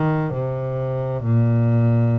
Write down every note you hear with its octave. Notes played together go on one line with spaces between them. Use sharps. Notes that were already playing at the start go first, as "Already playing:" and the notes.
Already playing: D#3
C3
A#2